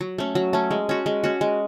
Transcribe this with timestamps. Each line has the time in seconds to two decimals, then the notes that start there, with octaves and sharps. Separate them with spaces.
0.01 F#3
0.18 A3 C#4
0.35 F#3
0.53 A3 C#4
0.71 G#3
0.89 C#4 F#4
1.06 G#3
1.24 C#4 F#4
1.41 G#3